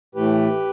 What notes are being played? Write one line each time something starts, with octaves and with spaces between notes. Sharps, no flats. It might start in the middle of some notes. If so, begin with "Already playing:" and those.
A2 E3 A3 G4 B4